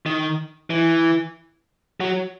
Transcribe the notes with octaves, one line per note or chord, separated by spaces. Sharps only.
D#3
E3
F#3